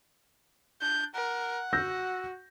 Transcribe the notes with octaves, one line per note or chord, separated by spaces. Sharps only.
D4 G6
A#4 F#5
F#4 E6 G6 A#6